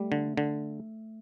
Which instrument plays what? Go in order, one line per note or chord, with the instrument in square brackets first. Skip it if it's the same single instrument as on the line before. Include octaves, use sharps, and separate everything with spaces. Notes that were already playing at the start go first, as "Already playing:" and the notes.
Already playing: [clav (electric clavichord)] G3 [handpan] A3
[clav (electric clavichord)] D3
D3